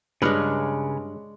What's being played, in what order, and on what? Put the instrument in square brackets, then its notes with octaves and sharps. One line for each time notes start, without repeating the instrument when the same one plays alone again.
[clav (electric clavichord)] G2 B4 [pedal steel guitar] C#3 B5 F6 [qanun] G#3 D4 C#5